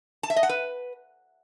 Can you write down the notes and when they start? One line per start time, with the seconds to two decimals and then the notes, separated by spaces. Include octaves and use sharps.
0.23 A5
0.30 E5
0.36 D#5
0.43 F#5
0.49 B4